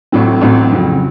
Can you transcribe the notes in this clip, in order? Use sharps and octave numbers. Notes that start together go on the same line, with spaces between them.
A1 A2 F#3 C4
A1 A2 F#3 C4
F2 C#3 F#3